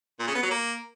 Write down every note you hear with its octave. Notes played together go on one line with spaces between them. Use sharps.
A#2
C#3
B3
F#3
A#3